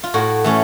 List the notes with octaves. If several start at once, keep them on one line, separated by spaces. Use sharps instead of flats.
F4
A2 F#4
E3 A3 C#4